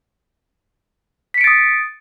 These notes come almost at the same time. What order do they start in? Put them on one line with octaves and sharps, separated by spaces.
B6 C#7 D7 A6 D#6